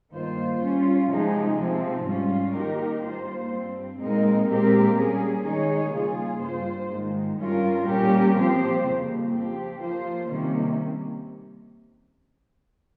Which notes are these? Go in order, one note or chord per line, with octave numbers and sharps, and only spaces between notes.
G2 D#3 A#3 F4 C5
G3 C#4 F4
C3 F3 G#3 D#4 G#4
C3 F3 C4
G#2 G3 C#4 F4
D#3 A#3 D#4 G4 A#4
G2 G3 A#3 F4 C5
G2 G3 C4
A#2 G#3 C4 D#4 A#4
A#2 G#3 C4 G4 A#4
G3 C#4 G#4
D#3 G#3 D#4 G#4 C#5
C#3 G3 A#3 F4 G#4
G2 G3 A#3 F4 C5
G#2 D#3 G#3
G2 G3 C#4 F4 A#4
A#2 G3 C#4 G4 A#4
F3 C4 G4 C5
F2 C#3 G3 A#3
F3 C4 G4
F3 A#3 F4 C5
C3 D#3 G3 A#3 C#4